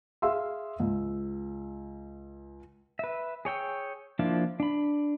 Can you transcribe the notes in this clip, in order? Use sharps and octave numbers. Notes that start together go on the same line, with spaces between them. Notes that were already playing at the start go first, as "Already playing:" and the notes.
G#4 E5 F5 C6 E6
C#2
B4 E5
G#4 C#5 G5 E6
F3 A#3 D4 E4 F4
D4 B5